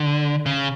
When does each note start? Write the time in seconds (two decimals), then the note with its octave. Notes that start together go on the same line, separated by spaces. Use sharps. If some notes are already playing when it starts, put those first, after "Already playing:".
Already playing: D3
0.46 C#3